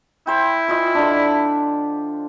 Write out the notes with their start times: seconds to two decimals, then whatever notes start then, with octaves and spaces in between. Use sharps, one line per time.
0.27 E4 C5 G5
0.68 E3 F4 D#5
0.95 D3 D4